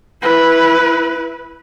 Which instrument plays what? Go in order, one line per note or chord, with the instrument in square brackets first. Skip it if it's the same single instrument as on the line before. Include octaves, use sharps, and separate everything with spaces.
[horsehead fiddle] E4 B4